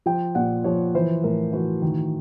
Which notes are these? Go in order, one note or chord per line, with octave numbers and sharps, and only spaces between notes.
F3 G5
A#2 F#5
F3 C#5
E3 C5
A2 A#4
E3 F#4
D#3